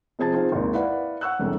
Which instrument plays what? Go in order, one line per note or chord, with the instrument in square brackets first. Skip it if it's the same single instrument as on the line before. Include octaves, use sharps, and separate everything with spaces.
[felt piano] C3 F3 C4 G#4 A5 A6
C4 D#4 F4 G#4
G#1 D#2
E4 B4 D5 F5 F#5
F#5 C#6 E6 F#6
E1 C2 A4